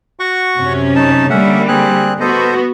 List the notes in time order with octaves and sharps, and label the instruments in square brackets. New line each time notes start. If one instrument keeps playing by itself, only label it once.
[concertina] F#4 F#5 C#6
[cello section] F#2 C3 C#4
[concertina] D#4 A5
[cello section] D3 G3 A#3 [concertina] C#4 E5 F#5
[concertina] C4 G#4 F#6
[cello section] B3 F#4 [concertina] A4 C5 D#5